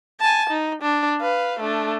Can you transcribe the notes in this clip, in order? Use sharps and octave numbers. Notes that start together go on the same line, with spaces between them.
G#5 A5
D#4
D4
B4 F5
A3 D4